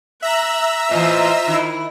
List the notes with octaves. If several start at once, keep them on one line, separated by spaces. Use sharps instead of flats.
E5 A#5 E6 F#6
A2 E3 F4 C5 D#5
D#3 E4